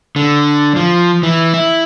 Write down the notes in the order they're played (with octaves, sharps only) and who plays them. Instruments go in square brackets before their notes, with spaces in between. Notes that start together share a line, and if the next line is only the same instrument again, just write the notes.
[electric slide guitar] D3
F3
E3
E4